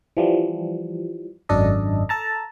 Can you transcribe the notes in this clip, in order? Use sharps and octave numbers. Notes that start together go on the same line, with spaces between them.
E3 F3 G3
G#1 F#2 D4 A4 D#5
A4 A5 A#5